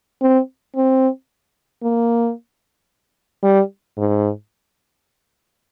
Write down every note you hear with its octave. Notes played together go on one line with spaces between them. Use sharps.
C4
C4
A#3
G3
G#2